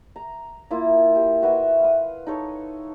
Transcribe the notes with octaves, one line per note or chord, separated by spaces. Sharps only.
A#5
A#3 E4 F4
G4
F#4 B4 E5
F5 D#6
D#4 A4 C#5